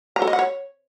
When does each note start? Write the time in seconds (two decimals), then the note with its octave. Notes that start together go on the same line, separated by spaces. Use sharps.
0.16 A#5
0.22 A4
0.27 D#5
0.33 F#5
0.39 C#5